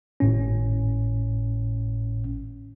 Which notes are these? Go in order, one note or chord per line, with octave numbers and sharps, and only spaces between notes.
G#1 A2 C#4